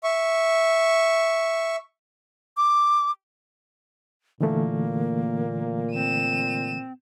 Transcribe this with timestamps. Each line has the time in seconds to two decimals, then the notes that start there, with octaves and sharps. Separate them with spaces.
0.03 E5 C#6
2.57 D6
4.41 A#2 D3 E3 A3 A#3
5.94 C4 D#7 E7